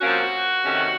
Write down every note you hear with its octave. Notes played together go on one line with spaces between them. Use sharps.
C3 F3 A#3 C#4 F#4
C3 D#3 A3 C#4